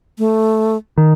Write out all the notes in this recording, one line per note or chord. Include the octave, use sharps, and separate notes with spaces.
A3
D#3